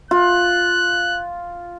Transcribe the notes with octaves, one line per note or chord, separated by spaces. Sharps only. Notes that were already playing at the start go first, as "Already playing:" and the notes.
F4 F#6